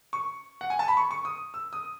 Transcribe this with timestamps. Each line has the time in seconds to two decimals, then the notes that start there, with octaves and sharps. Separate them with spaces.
0.13 C#6
0.61 F#5
0.70 G#5
0.79 A5
0.88 B5
0.97 C#6
1.11 C#6
1.25 D#6
1.54 E6
1.73 D#6